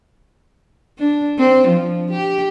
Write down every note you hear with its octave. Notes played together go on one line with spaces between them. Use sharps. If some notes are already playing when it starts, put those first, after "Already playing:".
D4
C4
F3
G4